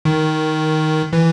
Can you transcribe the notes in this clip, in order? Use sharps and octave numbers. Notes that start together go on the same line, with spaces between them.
D#3
E3